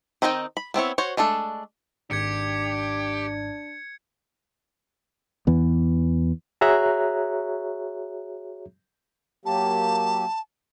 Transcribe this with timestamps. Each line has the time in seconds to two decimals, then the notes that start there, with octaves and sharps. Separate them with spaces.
0.22 D#3 C4 D#4 D#5 G5
0.57 B5
0.74 B3 C4 E4 C#5
0.98 F#4 C5 C#5
1.17 G#3 A3 D4 A4
2.11 G#1 G#2 D4 G4 G#6 C#7
5.47 E2 E3 B3
6.61 F#4 G#4 C#5 E5 A#5 F#6
9.45 F#3 A#3 G4 A5